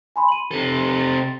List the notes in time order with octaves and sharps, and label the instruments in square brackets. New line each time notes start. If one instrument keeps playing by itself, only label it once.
[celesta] G#5 B5 C6
D#7 F#7
[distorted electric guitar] C3 A4
[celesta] A6